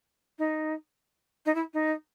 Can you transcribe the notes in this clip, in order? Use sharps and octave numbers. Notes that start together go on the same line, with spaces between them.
D#4
D#4
E4
D#4